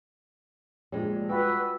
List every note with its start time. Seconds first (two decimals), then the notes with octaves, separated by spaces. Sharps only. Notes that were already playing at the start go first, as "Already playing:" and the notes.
0.92 A#1 A#2 G3 G#3
1.29 F4 F#4 B4 G5 E6